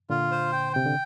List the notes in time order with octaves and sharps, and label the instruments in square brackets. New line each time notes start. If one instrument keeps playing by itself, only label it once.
[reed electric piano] A#2 D3 [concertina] F4
[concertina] C5
G5
[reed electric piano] C3 [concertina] G5
[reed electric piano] D3